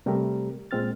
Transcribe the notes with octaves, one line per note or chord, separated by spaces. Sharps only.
C3 G3 A3 C4 G4 A#4
A#2 G#3 C4 F6 A6